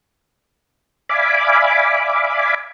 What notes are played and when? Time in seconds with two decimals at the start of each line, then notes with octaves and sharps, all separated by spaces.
1.09 D5 E5 F5 G#5 B5 D6